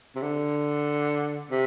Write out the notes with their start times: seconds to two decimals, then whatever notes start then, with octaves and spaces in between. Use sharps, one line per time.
0.16 C3
0.23 D3
1.51 C3